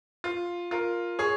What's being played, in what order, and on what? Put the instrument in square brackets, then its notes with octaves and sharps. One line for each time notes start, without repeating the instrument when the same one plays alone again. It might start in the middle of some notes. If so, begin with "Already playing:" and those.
[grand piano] F4
F4 A#4
G#4 C#5